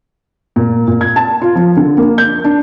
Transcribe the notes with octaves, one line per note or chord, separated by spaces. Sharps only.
A#2
A#2
G#6
A5
F4
F3
D3
A#3
G6
D4